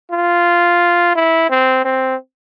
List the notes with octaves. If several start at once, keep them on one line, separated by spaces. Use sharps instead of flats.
F4
E4
C4
C4